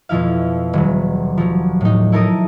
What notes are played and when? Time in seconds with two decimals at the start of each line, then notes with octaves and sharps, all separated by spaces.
0.09 F2 B2 F3 E4 F5
0.73 D#1 F#3
1.37 F3 F#3
1.81 A2 D#4
2.12 E4 A4 A#4 A#5 D#6